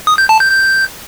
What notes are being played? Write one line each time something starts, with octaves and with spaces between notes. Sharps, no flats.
D#6
G6
A5
G6
G6